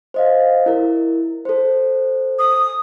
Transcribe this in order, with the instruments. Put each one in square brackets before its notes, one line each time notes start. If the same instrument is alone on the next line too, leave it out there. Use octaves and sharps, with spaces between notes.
[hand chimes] C5 D#5 F5
E4 A#4
A4 C5
[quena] D#6